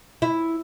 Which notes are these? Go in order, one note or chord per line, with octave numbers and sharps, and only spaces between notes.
E4